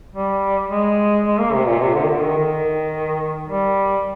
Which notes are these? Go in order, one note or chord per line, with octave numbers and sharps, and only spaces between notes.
G3
G#3
G#3
A#3
C3
A#2
C3
D3
D#3
D3
D#3
D#3
G3